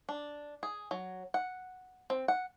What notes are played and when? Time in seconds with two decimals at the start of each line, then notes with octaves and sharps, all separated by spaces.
0.09 D4
0.63 G#4
0.91 F#3
1.34 F#5
2.10 C4
2.28 F#5